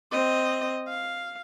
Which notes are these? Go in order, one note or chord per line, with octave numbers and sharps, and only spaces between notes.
C4 D#5
F5